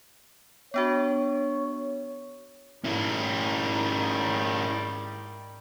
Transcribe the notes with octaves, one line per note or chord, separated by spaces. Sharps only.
B3 D4 F#4 C#5
G#2 D#3 G3 C#4 E4